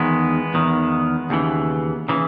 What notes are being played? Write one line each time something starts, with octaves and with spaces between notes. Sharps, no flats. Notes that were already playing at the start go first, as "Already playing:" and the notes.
Already playing: E2 D#3 G#3 B3
E2 D#3
D#2 C#3 E3
C#3 E3